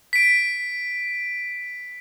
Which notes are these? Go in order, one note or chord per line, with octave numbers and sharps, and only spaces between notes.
B6 D7